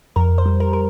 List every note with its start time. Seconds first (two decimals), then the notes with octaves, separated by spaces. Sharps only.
0.16 F2 A#4
0.38 C5
0.46 G3
0.60 A#4
0.73 A#4